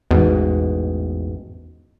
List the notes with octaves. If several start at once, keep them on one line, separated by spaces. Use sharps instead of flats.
A1 E2 G#2 B2